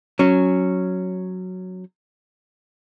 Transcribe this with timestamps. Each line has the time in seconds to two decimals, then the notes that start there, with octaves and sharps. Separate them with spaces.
0.19 F#3 C#4